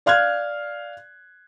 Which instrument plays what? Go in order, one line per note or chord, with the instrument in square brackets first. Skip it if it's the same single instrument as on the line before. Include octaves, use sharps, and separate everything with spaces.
[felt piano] D5 F5 F6 F#6 G#6